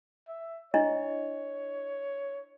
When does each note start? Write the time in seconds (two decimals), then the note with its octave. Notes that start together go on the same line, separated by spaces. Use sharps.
0.28 E5
0.74 D4 E4 C#5 D#5